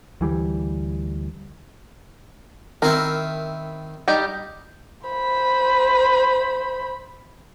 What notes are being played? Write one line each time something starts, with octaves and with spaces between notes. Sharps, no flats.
D2 E3 G3
D#3 C4 E4 A#4
G3 D#4 G4
C5 B5